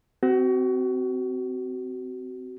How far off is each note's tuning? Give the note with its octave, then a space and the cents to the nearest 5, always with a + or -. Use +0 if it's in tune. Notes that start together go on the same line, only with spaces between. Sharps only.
C4 -20 F#4 +25